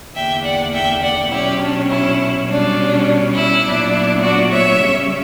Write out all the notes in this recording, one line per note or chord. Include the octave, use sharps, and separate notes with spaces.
E2 D3 A#3 E5 G5
D5 F#5
E5 G5
D5 F#5
B2 F#3 C#4 E4 G4
D4
E4
B2 G3 C#4 D4
E4
A#2 F#3 B3 D4
E4
D4 F#4
C#5 E5
C#3 G3 C#4